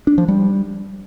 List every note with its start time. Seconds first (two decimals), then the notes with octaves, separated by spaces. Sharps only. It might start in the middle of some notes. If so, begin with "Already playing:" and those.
0.07 D4
0.18 F3
0.28 G3